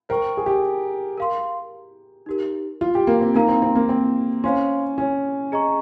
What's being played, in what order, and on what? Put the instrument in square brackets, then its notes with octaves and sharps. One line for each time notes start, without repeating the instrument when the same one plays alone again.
[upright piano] A#4 [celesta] C5 G5 C#6
[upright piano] G#4
G4
[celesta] A#4 F5 C6
D#4 G4 A#4
[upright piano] F4
G4
A#3
C4
[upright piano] A#3 [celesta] D#4 A#4 F5 A#5
[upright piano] C4
C4
A#3
C4
[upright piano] C#4 [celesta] C5 F5 C6
[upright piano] C#4
[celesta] G#4 D#5 A#5 C#6